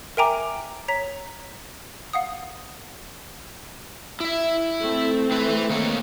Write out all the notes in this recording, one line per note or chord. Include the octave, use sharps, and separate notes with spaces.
A#4 E5 G5 G#5 A#5 D6
C#5 A#5 B6
F5 F#5 D#6
E4 E5
A3 C4
E4 B4
D#3 A#3 C#5